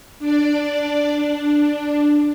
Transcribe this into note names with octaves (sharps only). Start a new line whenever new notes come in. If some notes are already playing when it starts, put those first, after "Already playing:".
D4 D5
D4